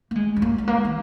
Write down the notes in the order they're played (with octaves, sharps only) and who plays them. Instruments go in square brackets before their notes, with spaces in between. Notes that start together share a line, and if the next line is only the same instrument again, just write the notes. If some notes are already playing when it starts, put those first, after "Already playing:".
[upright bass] A#3
G#3
C#4
A#3
G#3
A#3
D#3